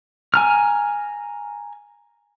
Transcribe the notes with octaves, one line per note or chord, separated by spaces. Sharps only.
G#5 A#5 F6